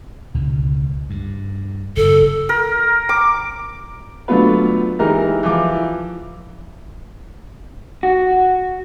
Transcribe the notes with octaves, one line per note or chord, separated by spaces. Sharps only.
C#2 B2 D3
G2
F#1 A4
A#4
D6
D3 F#3 A3 B3 F4 B4
E3 G#3 D#4 G4 A#4
E3 F3 D6
F#4